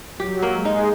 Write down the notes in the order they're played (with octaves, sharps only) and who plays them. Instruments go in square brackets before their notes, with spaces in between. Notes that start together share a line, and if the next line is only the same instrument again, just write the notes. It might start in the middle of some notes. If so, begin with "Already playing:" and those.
[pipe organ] F#3 [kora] G4
[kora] A#3
[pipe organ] G#3
[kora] D#4